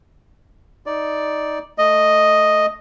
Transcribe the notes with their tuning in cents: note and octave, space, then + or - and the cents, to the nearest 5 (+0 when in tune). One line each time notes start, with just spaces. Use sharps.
D#4 +10 D5 +0
A3 +0 D#5 +0